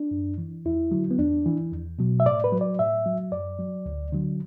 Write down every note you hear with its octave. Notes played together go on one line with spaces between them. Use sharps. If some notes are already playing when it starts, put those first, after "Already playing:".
Already playing: D4
F#2
E3
E2 E4
D3 F#3
B3
E2 D4
E3
E2
B2 F#3
E5
A2 D5
B4
F#3
D5
A2 E5
F#3
F#2 D5
F#3
D2
D3 F#3